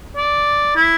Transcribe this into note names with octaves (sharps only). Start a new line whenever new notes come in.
D5
E4